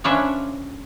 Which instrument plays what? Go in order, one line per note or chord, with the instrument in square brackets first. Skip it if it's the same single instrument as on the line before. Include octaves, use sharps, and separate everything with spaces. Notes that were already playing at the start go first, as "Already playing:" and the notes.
[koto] F3 C#4 D4 B4 E5